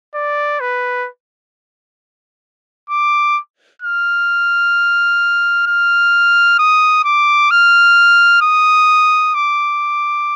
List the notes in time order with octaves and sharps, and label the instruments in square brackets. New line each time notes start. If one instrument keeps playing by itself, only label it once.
[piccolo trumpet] D5
B4
D6
F6
F6
D#6
D6
F6
D#6
D6